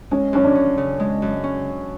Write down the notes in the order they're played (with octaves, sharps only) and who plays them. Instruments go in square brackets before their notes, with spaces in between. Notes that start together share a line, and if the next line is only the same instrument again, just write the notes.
[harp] G#3 [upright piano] C#4
[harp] F#2 [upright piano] C#4
[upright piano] D4
[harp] C#4
C#3
G#3
F#2
C#4